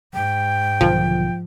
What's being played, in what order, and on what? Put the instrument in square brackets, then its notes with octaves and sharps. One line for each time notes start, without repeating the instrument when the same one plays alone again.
[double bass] G#2 [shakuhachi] G5
[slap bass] B1 D3 D#3 [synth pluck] F3